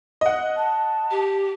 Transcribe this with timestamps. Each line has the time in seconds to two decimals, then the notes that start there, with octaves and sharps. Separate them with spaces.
0.21 D#5 F#5
0.57 A5
1.11 G4